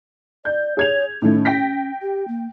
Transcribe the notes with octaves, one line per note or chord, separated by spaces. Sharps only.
D5 G6
G#4 C#5 G#6 F7
A2 D#3 A3 C#4
G5 A#6 B6
G4
A#3